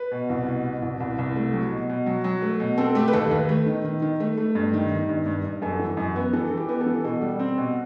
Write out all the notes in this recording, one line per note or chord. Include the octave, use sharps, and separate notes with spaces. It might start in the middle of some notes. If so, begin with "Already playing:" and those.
Already playing: B4
B2
C2
B2
B2
C2
C2
C2
A3
F#3
B2
B2
F#3
F#3
A3
B2
C4 A4
A3 G4
B4
D#2 A4
D#2 B4
A3
D#3
D#3
D#3
A3
A3
G2
D#3
D#3
G2
G2
G2
F#2 A4
E3
F#2
B3
E3 A4
E3
G4
B3
A4
E3
B2 A4
G3
C4
B2